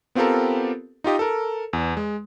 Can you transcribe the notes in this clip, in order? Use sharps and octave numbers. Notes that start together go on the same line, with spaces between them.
B3 C4 F4 G4 A4 A#4
D#4 F4 G4 D#5
A4 A#4
E2
G#3